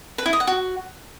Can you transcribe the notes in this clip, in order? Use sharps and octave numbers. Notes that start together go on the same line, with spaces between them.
B4
E4
D#5
F#5
F#4